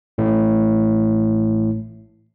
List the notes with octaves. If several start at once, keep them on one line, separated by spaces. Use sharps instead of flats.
A1 A2